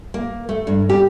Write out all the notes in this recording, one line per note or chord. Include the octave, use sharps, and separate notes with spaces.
A#3
A3
G2
G4